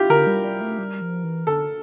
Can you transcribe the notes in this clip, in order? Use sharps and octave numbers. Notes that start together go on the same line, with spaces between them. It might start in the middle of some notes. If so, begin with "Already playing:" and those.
Already playing: E4 F4 G4
D3 A#4
G3
G3
A3
G3
F3
E3
D3 A4